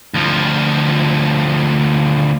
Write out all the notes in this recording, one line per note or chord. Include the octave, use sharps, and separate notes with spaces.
D2 F3